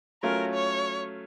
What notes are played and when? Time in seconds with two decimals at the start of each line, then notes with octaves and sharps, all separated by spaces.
0.23 F#3 A3 C#4 F4 A#4
0.53 C#5